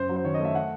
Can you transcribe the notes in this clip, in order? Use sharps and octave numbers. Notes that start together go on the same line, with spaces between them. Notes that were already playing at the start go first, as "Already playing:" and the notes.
Already playing: F#2 C5
F#3
C5
D#3 C#5
D#5
A3 E5
F#5